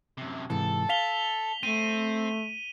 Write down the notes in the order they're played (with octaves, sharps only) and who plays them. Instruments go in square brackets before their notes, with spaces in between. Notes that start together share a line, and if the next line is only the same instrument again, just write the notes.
[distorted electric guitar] F#2 C3
[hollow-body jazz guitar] G#2 C3 E3 [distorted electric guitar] A4
[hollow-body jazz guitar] F5 [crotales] B6 F7 G7
[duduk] A3 [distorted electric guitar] C4 [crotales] D#7